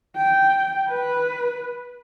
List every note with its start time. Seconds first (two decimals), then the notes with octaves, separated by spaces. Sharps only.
0.16 G5
0.88 B4